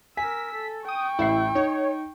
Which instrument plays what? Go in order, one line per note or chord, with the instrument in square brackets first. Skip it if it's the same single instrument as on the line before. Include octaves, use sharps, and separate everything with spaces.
[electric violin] A#4 E6 [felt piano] G#5 [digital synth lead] B6
[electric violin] A4
[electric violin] G5 C#6 [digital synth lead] D#6
[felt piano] A1 E5 C7 [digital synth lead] E4
[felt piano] D#4 [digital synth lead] C#5